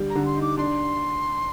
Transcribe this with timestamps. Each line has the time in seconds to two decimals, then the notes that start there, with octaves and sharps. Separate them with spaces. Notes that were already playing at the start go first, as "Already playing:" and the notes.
Already playing: D3 G3
0.10 A#5
0.15 D3
0.26 C6
0.36 D#4
0.42 D6
0.58 D4 C6